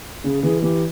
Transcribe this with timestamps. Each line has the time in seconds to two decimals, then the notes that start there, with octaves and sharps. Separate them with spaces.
0.24 C#3 G#4
0.43 E3 G#4
0.62 E3 G4